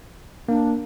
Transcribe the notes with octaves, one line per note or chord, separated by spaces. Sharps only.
A#3 D4